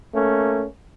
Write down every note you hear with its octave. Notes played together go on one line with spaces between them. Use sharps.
A3 A#3 C#4